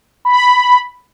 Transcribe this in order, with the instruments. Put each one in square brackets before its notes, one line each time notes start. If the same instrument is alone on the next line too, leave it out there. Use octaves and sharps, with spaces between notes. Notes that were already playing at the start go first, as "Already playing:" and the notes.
[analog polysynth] B5